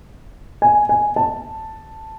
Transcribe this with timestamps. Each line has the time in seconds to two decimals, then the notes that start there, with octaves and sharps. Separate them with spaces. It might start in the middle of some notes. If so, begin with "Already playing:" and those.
0.62 G#5
0.89 G#5
1.16 A5